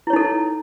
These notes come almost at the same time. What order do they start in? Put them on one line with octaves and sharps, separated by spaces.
E4 C#5 D#4 A4